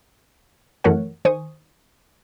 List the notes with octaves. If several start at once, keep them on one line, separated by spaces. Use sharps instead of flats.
F#2 E3 A3 A#4 C#5 F#5
D#3 C5 G#5 C#6 D#6